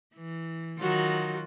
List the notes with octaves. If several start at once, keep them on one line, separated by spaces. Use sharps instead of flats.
E3
D#3 F#3 F4 F#4